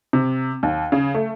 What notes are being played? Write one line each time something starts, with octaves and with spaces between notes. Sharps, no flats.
C3
D#2
C#3
A3